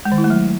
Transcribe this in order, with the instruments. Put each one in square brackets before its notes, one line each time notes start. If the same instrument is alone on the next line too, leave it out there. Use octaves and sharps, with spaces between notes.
[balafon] G#3
D#3
E4
A3
F#3